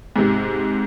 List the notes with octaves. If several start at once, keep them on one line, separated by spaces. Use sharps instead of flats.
G#2 C3